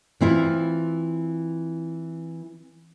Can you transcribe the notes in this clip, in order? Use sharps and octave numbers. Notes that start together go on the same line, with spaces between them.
E3 C4 E4 F4